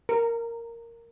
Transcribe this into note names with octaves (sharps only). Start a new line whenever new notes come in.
A#4